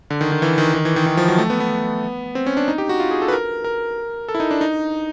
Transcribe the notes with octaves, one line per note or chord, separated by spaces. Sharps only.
D3
D#3
D#3
E3
D#3
D#3
E3
D#3
D#3
F3
F#3
A3
B3
B3
C4
C#4
D4
D#4
G4
F#4
F4
G#4
A4
B4
A#4
A#4
A4
E4
D#4
D4
D#4